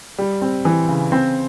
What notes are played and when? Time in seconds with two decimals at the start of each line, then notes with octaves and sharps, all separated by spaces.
0.19 G3
0.42 C4
0.65 E3
0.88 C#3
1.12 C4